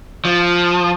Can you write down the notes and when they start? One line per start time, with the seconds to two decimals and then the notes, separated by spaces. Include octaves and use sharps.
0.25 F3